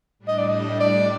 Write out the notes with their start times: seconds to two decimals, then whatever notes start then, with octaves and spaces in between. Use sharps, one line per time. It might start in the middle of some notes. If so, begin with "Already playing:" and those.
0.19 A2 G3 D4
0.28 D#5
0.38 D5
0.48 D#5
0.80 D5